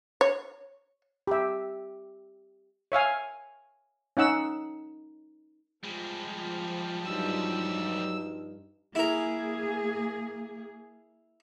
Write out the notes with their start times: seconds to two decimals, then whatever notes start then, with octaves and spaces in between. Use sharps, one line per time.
0.21 C#5
1.27 G4 E5
2.92 C#5 E5 F5 G#5
4.17 C#4 D#4 F#5 E6
5.84 F3 G3 G#3
7.06 G2 F#3 D#4 E6
8.95 A#3 E4 G#4 A#4